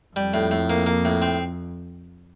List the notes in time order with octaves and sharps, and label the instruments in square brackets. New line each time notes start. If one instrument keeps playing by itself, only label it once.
[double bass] F2 [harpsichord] G3
[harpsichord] A2
A2
A#3
A#3
A2
C4